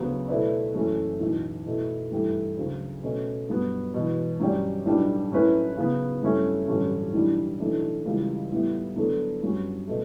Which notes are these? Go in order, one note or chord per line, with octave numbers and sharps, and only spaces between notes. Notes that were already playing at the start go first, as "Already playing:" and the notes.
Already playing: D2 C#3 F#3 B3
B2 A3 E4 B4 D5
F#1 F#2 E3 A3 C#4
B1 A2 E3
B2 A3 E4
G2 E3 A3 E4 G4
D2 C#3 F#3
B2 A3 C#4
G2 F#3 B3 F#4
E1 E2 B2
G2 F#3 C#4 G4 D5
B1 A2 G3 D4 G4
A2 F#3 C#4 E4 B4
C#3 F#3 B3
G2 F#3 A3 C#4 E4
A1 G2 D3 F#3 C#4
B1 A2 E3 G3 D4
B1 A2 E3 A3 D4
C#2 C#3 E3 G3
A2 G3 B3 E4
D3 F#3 B3 D4 A4
G2 F#3 C#4 F#4
B2 A3